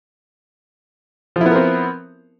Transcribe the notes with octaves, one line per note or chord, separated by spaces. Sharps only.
F3 B3 C4 E4 A#4